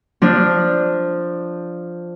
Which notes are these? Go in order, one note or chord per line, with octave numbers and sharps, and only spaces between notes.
F3 D4